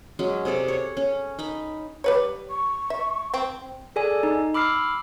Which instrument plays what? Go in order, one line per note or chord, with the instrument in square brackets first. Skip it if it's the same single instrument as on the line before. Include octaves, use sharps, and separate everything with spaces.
[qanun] F#3 G#3 C#4
C3 G#4 A4 D5
C#5
C#4
D#4 B5
[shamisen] G3 B4 C#5
[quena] C#6
[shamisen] E5
C4
[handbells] G#4 A4 D5 G#5
D#4
B5 D6 E6 F6 C7